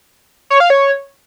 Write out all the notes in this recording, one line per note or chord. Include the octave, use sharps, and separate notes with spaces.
C#5
F5
C#5